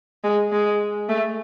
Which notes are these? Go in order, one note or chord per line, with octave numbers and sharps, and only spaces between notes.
G#3
G#3
A3